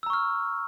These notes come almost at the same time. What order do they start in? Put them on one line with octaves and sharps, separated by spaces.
E6 A#5 C#6 F6